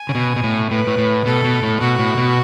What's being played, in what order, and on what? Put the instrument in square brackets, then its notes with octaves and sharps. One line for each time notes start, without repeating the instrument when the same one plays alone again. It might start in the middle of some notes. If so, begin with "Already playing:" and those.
Already playing: [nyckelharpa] G#5
[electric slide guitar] C#3
B2
B2
A2
[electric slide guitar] A2 [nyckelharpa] B4
[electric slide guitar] A2
A2
[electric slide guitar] B2 [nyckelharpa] A4
[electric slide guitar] B2
A2
[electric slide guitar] B2 [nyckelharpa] F#4
[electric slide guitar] A2
B2